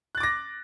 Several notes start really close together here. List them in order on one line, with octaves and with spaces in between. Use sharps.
F#6 A6 D6 A#6